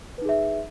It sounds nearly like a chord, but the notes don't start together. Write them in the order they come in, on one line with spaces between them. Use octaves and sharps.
B4 D#4 G#4 E5